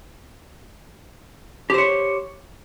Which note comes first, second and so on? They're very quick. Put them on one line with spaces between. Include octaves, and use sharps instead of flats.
G4 C5 C#5